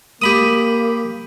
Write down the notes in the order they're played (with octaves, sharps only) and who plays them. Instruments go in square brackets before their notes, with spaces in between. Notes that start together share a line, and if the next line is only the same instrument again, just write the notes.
[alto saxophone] A#3 [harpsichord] G4 B5 D#6